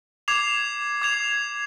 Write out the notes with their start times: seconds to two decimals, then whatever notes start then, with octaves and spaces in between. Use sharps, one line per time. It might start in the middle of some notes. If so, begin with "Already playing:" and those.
0.28 D6 G#6 C7 F7
1.02 D6 G#6 C7 F7